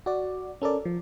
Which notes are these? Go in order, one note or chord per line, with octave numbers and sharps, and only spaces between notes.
F#4 D5
C#4 A4 A#4 D5
F3